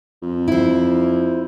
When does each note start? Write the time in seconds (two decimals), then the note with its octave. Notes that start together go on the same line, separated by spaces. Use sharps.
0.22 F2
0.48 E4 C5